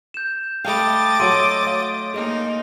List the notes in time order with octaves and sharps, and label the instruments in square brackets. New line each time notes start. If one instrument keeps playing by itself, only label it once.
[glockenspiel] G6 E7
[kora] A3 F5 [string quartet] D#5 D6 A6 [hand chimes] G5 A5 B5
[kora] F#3 A3 [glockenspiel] C6 D7 D#7 [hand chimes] E6
[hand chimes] C#5 F5
[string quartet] A#3 D#4 [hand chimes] G#4 D#5